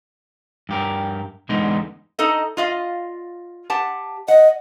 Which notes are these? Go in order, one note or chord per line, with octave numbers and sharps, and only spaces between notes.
G2 G4 A#4
E2 D3 G#3 B3 D#4
D#4 A4 D#5
F4 D#5 F5
G4 F#5 A5
D#5 F#5